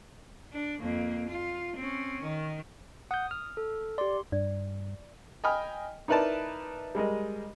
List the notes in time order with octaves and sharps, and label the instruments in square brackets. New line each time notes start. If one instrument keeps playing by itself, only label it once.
[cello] D4
F2 A#3
F4
C4 C#4
D#3
[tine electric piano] F#5 G6 [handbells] D#6
[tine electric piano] F6
[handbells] A4
[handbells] G4 C6 [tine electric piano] D5
[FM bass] G2 [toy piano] D5
[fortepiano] D#5 G5 G#5 B5 D#6 F6
D#4 E4 A#4 B4 D5 A5
G3 G#3 A#4 D#5